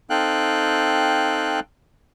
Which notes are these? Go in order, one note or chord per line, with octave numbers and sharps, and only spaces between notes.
C4 D#4 A4 F5 G5 F#6